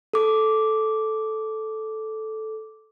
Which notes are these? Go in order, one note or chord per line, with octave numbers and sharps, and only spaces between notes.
A4 D6